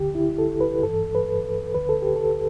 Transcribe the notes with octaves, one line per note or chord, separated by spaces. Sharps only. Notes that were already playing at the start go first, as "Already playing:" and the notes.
Already playing: D2 D3 G4
E4
A4
B4
G2 E3 A4
B4
D2 D3 B4
A4
G4
A4